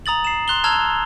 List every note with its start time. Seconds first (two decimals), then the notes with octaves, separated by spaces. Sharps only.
0.06 A#5 D#6 A6 F#7
0.25 C7 E7
0.48 C6 F#6 F7 G7
0.64 A5 A#5 E6 F6 G#6 F7